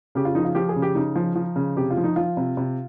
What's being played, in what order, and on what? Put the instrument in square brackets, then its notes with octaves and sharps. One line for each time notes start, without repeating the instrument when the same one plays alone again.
[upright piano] C#3 G4
F4
F3 D#4
F4
F3 G4
G#4
C#3
G4
C#3 D#4
F3
F3
C#3
C3 G4
F4
F3
D#4
F3 F4
C3
C3